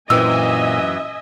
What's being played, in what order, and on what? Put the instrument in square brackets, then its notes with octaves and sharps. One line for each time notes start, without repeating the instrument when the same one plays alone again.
[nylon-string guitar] F#2 E3 C4 [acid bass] A#2 [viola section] D#5 E5 G#5 [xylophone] E6